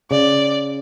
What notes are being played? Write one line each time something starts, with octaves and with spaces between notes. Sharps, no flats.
C#3 D5